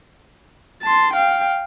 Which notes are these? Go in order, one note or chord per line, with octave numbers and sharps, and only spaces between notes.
A5 C6
F5 G5